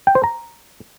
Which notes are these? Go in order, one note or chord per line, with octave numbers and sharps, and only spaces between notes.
G5
C5
A#5